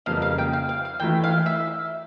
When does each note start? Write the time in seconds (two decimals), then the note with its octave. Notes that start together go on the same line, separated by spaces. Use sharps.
0.06 F2 C#3 G3 A#3 F5
0.22 F5
0.38 G5
0.53 F5
0.69 F5
0.85 F5
1.00 E3 A3 E4 G5
1.24 F5
1.46 E5